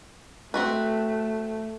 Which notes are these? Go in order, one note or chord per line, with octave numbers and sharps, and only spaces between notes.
A3 C4 F#4 B4